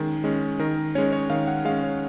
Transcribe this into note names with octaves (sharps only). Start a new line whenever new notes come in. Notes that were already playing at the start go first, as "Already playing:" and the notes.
Already playing: D#3 G#3 C#4
G#3 C#4
D#3 A#4
G#3 C#4 C#5
C#5
D#3 F5
F#5
G#3 C#4 F5
C#5